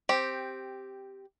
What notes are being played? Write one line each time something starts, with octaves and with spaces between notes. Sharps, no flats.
C4 G4